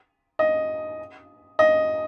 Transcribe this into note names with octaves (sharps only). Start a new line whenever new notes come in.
D#5
D#5